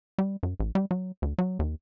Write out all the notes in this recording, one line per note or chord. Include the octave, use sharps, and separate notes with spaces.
G3
F#2
A1
G3
F#3
D2
F#3
D#2